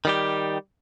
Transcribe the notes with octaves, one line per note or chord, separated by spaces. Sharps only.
D#3 G3 G4